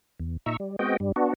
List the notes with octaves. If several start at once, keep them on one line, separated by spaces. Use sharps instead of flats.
E2
A#2 D#4 E5 A#5 C#6 E6
G3
G#3 B3 C4 F#4 D#5 G5
G2 G3
B3 D4 F#4